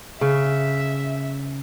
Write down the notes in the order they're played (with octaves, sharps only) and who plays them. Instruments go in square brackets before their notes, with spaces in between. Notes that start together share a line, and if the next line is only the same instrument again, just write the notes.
[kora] C#3 [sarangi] E5